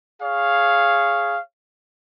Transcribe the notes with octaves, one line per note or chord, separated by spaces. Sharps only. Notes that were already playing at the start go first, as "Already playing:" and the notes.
G#4 C#5 F5